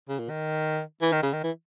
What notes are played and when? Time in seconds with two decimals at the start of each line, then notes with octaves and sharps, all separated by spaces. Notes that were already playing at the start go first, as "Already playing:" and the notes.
0.09 C#3
0.19 A#2
0.30 D#3
1.02 E3
1.12 D#3
1.23 C#3
1.33 D#3
1.44 E3